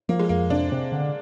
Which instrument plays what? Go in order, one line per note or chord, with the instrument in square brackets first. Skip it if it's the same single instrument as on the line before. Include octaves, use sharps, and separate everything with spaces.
[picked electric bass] F3 [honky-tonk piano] A#3
[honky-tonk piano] G#3
[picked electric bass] F2 [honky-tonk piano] A#3
[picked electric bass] C3 [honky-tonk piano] D4
[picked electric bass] C3
D3